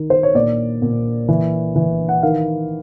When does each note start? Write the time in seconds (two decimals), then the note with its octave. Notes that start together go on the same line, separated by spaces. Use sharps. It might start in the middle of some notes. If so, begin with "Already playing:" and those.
Already playing: D#3
0.10 C5
0.23 C#5
0.35 A#2 D5
0.82 A#2
1.29 E3
1.76 E3
2.09 F#5
2.23 D#3 F5